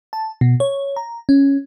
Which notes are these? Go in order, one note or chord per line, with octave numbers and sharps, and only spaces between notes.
A5
B2
C#5
A#5
C#4